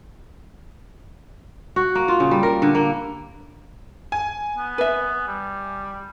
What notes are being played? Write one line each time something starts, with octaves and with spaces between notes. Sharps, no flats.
F#4
A#3
F4
C#3
G3
A#4
D3
A#3
G#5
B3
B4 E5
G3